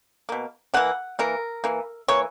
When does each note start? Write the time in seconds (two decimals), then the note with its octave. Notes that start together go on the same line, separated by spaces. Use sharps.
0.29 B2 A#3
0.74 E3 A#3 F#5
1.19 E3 A#3 A#4
1.64 E3 A#3
2.08 E3 A#3 C#5